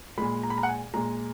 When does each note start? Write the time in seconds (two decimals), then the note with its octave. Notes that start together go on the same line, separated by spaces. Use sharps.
0.18 A#2 G#3 B5
0.43 A#5
0.50 B5
0.58 A#5
0.63 F#5
0.68 G#5
0.94 A#2 G#3 A#5